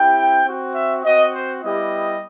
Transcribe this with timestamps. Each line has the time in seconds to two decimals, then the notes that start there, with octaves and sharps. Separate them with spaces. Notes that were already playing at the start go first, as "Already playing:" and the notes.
Already playing: C4 E4 G4 G5
0.45 C4 F#4
0.75 E5
1.04 C4 F#4 D#5
1.34 C5
1.63 G3 B3 E4 G4 D#5